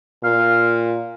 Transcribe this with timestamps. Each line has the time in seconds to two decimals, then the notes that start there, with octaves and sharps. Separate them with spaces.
0.24 A#2 F5